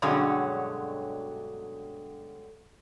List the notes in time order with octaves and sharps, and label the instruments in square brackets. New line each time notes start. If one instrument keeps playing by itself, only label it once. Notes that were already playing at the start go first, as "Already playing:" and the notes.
[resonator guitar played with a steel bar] G2 B2 D3 F#3 G#3 C#4